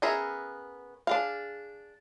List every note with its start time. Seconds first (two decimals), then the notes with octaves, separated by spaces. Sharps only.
0.02 B3 C#4 G#4 A#4 E5
1.07 D4 G#4 F5